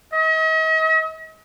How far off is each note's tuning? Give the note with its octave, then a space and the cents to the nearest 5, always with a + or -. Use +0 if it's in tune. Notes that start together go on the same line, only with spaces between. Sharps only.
D#5 +40